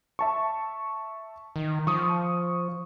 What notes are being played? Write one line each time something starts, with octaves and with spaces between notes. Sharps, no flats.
E5 A5 C#6
D#3
F3 C#6 D#6